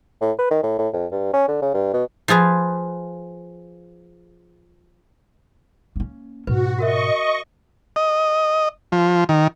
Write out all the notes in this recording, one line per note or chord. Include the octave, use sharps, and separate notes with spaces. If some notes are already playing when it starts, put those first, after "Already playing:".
A2
B4
D#3
A2
A2
F2
G2
C#4
D3
C#3
G2
B2
F3 F4 G#4 B4
A#3 C#4
G#2 B2 F#4 B4
F#4 A#4 D#5 E5 C#6
D#5
F3
D#3